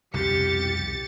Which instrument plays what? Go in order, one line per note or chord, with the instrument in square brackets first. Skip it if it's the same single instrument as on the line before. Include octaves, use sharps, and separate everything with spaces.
[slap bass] C2 F2 B2 [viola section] G4 [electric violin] A6 C#7